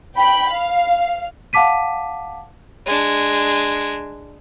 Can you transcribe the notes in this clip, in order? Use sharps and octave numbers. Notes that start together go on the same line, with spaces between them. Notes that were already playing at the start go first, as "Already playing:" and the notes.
G5 B5
F5
F5 F#5 A5 D6 B6 D#7
G#3 D4